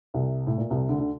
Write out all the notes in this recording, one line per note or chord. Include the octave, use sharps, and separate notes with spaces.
C2 C3
A2
A#2
C2 C3
D2 D3
D3